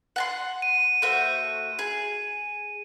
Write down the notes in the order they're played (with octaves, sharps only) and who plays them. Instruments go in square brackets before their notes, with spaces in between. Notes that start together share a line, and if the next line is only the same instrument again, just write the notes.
[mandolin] F#5 A5 C6
[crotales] D#7
[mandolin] A3 F#4 C5
G#4